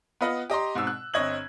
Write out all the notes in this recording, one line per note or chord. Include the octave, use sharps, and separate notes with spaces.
B3 F4 B4 D#5 F#5
G4 D#5 A#5 C6
G#2 B2 C4 E6
F#6
G1 C4 C#5 D#5 G#6 F#7